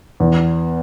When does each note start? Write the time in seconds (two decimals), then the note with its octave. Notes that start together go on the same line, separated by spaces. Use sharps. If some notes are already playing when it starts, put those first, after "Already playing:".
0.20 E2